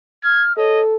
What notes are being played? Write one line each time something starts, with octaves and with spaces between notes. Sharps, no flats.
F6 G#6
A4 C#5 D#5